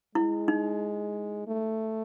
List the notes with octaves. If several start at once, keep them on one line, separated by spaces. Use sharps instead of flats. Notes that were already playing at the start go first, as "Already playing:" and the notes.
G#3 E4
D#4
A3